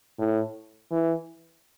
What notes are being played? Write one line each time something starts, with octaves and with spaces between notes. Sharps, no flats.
A2
E3